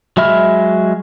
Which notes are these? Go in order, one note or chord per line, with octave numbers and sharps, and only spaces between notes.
F#3 G#3 E5 B5 F6